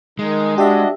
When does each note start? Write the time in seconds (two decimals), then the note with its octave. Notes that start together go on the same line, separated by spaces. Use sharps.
0.19 D#3 G#3 D#4
0.58 D4 F#4 G4 D#5 E5